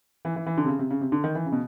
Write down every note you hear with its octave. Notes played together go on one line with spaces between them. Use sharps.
E3
E3
E3
D3
C3
C#3
C3
C#3
C3
D3
D#3
E3
C#3
B2